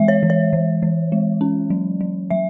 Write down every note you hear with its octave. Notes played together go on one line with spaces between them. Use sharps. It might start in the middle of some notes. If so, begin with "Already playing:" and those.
Already playing: E3 G#3 E5
C#5
E3
C#5
E3
E3
G#3
C#4
F#3
F#3
F#3 E5